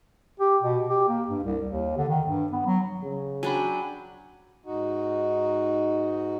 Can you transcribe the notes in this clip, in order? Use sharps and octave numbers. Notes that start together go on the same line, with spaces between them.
G4
B2
G4
A#3
G2
C2
D#2
D3
D#3
G2
B3
F#3
C#3
F#3 D4 G5 G#5 B5
G#2 D#4 F#4